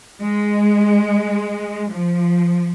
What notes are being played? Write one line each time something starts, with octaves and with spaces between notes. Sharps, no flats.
G#3
F3